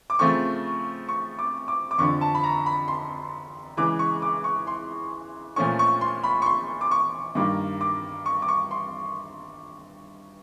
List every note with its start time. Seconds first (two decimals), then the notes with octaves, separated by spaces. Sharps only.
0.10 D6
0.19 C#3 F3 A3 C4 C#6
1.09 C#6
1.39 D6
1.68 D6
1.91 D6
1.98 F2 D3 F3 C#6
2.21 A5
2.35 B5
2.44 A#5
2.66 B5
2.88 C6
3.77 C#3 E3 G#3 D6
3.99 C#6
4.22 D6
4.44 C#6
4.67 C6
5.56 A#2 F3 A3 C#4 C#6
5.79 C#6
6.01 C6
6.24 B5
6.42 C#6
6.46 C6
6.81 D6
6.91 C#6
7.35 G2 D#3 G3 A#3 D6
7.81 D6
8.26 C#6
8.42 D6
8.48 C#6
8.71 C6